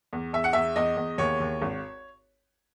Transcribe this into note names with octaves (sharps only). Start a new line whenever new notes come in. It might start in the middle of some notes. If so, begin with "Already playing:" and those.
E2
E2 E5
F#5
E2 E5
E2 D#5
E2
D#2 C#5
D#2
G#1